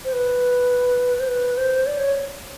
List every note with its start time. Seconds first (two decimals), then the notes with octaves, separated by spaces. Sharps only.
0.05 C5
0.13 B4
1.20 C5
1.28 B4
1.57 C5
1.87 D5
1.98 C#5